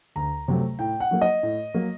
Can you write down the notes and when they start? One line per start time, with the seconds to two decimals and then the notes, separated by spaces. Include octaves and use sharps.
0.16 D2 A#5
0.48 C3 F#3 A3
0.79 A2 G5
1.00 F#5
1.11 F#3 A#3
1.22 D#5
1.43 A2
1.74 F#3 A#3